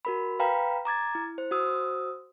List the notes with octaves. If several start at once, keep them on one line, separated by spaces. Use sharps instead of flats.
F#4 A#4 B5
B4 F5 G5 A#5 B5
A#5 D6 G#6 A6
E4
C5
F#4 C5 D#6 E6